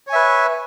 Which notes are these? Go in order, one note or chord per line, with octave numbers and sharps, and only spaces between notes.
B4 C#5 E5 G#5